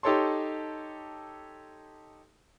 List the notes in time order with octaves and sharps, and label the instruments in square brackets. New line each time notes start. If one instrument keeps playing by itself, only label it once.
[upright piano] D#4 G4 A4 C#5 A5 C6